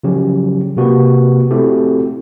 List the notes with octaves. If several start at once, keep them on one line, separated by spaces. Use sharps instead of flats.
C#3 F3 F#3 C#4 G4
C3 A#3 F#4 G4 B4
A3 C4 E4 F#4 G4 A4